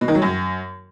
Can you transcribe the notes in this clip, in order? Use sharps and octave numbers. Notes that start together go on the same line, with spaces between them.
B2
D#3
F#3
F#2